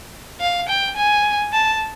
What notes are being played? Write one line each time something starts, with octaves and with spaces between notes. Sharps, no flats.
F5
G5
G#5
A5